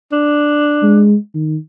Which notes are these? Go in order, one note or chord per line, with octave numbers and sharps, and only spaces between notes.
D4
G#3
D#3